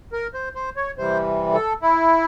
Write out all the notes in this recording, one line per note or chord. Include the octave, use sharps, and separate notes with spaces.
A#4
C5
C5
C#5
C3 E3 G3 C5
A4
E4